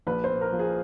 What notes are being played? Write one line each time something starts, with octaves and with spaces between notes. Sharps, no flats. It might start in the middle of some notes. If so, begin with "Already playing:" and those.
A#1 B4
C5
A#2
A#4
F3
G#4